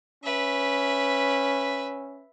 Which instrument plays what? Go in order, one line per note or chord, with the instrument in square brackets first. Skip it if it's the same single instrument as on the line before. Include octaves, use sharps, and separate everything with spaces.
[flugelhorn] C#4 [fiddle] B4 E5